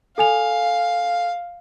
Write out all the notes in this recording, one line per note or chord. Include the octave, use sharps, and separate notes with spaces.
A4 F5 G#5 F7